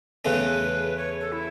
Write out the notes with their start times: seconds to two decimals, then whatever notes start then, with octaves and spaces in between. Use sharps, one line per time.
0.25 E2 C#3 A3 C#4 B4
0.97 C#5
1.21 A4
1.32 E4